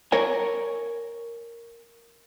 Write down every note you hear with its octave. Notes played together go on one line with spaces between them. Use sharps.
A#4 C#5 G#5